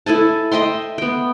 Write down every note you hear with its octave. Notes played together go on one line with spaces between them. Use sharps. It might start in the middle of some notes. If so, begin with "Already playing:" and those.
E4 A4 G#5 A5
D#5 E5 G5 C6
B3 G5